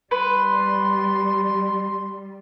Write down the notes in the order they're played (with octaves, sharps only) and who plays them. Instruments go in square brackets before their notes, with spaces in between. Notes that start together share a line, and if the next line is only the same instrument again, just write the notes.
[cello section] G3 [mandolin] B4 [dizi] C6